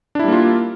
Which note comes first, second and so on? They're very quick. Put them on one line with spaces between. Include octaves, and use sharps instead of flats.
D4 E4 G3 A#3 F4